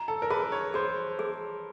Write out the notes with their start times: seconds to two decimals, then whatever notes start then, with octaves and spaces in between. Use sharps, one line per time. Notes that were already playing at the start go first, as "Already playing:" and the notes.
Already playing: A#5
0.08 A4
0.22 A#4
0.30 G#4 B4
0.52 C#5
0.74 G#4 C5
1.19 G#4